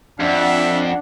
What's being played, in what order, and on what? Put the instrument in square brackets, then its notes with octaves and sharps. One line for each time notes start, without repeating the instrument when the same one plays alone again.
[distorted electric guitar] F2 [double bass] D4 [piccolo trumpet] E5 [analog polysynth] F#5